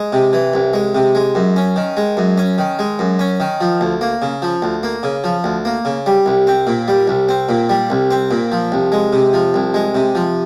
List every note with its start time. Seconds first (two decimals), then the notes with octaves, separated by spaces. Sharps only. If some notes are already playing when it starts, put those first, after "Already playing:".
Already playing: G#3
0.13 C3
0.33 E3
0.53 C2
0.73 G#3
0.95 C3
1.15 G#3
1.35 F#2
1.56 C#4
1.76 D#3
1.97 G#3
2.17 F#2
2.38 C#4
2.58 D#3
2.79 G#3
2.99 F#2
3.19 C#4
3.40 D#3
3.61 F3
3.81 D2
4.01 A#3
4.22 C#3
4.42 F3
4.62 D2
4.83 A#3
5.03 C#3
5.24 F3
5.44 D2
5.65 A#3
5.85 C#3
6.06 G3
6.26 C2
6.47 C4
6.67 A#2
6.88 G3
7.08 C2
7.29 C4
7.49 A#2
7.69 G3
7.90 C2
8.11 C4
8.31 A#2
8.52 F3
8.72 C2
8.92 G#3
9.13 C3
9.33 F3
9.54 C2
9.74 G#3
9.95 C3
10.15 F3